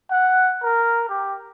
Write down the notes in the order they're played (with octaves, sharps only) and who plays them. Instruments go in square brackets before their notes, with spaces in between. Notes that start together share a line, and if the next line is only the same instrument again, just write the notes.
[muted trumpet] F#5
A#4
G4